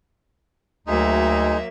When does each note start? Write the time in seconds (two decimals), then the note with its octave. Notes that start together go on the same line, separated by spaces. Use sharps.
0.87 D2 F#3 G#3 A#3 D#4 E5